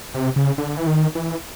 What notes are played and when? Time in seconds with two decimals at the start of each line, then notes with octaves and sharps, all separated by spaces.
0.14 C3
0.36 C#3
0.58 D3
0.77 E3
0.87 D#3
1.15 E3